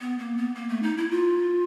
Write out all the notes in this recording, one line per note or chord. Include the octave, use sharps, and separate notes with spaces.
B3
A#3
B3
A#3
A3
D#4
E4
F4